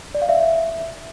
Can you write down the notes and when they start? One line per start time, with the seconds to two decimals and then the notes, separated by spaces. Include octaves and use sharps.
0.15 D5
0.22 F5
0.29 E5